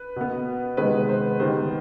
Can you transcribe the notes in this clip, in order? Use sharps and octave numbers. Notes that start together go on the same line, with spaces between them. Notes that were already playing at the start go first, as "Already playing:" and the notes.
Already playing: B4
B2 B3
C3 D#3 G#3 B3 B4
C5
D#3 G3 B3 C5